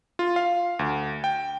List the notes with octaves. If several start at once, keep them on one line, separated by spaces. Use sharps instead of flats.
F4
F5
D2
G5